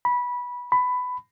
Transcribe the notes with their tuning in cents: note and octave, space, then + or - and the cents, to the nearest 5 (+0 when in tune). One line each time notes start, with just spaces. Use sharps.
B5 -15
B5 +15